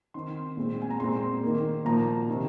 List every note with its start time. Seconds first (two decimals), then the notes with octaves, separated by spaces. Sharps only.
0.14 D#3 C4 C6
0.57 A#2 G#3 C4
0.82 G#5
0.90 A#5
1.00 A#2 G#3 C4 C6
1.43 D#3 A#3
1.85 A#2 F3 A#3 A#5
2.28 C3 D#3 C4